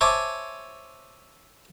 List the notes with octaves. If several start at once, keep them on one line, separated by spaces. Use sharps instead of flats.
C5 C#5 E5 G#5 A5 D6